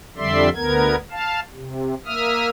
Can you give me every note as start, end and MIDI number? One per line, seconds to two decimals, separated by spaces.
0.17 0.49 41
0.17 0.49 50
0.17 0.49 55
0.17 0.49 74
0.17 0.49 76
0.17 0.49 84
0.55 0.96 38
0.55 0.96 59
0.55 0.96 70
0.55 0.96 92
1.11 1.40 77
1.11 1.40 81
1.54 1.94 48
2.06 2.49 58
2.06 2.49 76
2.06 2.49 87
2.06 2.49 89